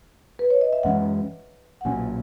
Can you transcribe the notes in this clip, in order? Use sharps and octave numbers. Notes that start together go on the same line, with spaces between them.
B4
C#5
D#5
E5
F#2 E3 G#3 C#4 F#5
F#5
B1 A#2 F#3 C#4 G#5